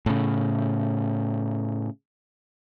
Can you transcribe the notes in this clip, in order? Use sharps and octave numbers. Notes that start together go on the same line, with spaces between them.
A2 C#3